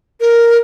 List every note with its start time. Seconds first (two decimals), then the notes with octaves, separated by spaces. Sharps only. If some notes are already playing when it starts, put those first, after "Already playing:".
0.20 A#4